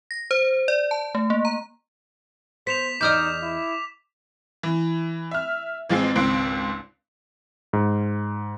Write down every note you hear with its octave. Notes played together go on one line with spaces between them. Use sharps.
A#6
C5
D5
A5
A3
A#3
A#5
B3 C5 B6 E7 F7
E2 D#4 D5 D#5 D6 D#6 F6 G6
E4
E3
E5 F6
A1 F3 G#3 C4 C7
G#1 C#2 C4 C6 F#6 D7
G#2